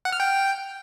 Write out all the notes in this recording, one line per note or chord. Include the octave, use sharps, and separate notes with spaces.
F#5
F6
G5